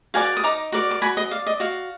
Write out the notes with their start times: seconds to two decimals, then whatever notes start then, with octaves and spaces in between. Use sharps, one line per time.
0.14 F#4 A#4 D5 F5 G#5
0.37 D#6
0.44 D#4 A#5 D6
0.72 F#4 A#4 D5
0.91 D6
1.02 F#4 G#5 B5
1.17 D#5
1.31 D5 F5
1.46 D#5
1.60 F#4 F5